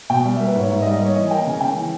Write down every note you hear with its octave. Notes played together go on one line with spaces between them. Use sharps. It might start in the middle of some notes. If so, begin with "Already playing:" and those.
B2 G5
G3
A#3 E5
B4
G#2 C#5
G#2 E5
D#5
G3
D#5
A#3 C#5
E3 D#5
G#5
A#3 G5
C#3 G#5
C#3 G5
E3